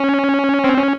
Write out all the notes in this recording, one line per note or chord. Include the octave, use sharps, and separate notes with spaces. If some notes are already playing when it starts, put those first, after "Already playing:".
Already playing: C#4
C4
C#4